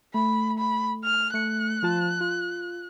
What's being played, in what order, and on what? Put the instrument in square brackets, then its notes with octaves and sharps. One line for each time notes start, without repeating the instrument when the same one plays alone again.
[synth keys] A3 [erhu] B5
[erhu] B5
F6
[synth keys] A3 C#7 [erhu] F#6
[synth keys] F3 F4 A5
F4